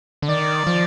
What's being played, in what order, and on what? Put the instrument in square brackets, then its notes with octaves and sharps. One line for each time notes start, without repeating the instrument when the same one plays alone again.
[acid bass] D3
[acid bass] D#3 [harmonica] D5
[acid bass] F3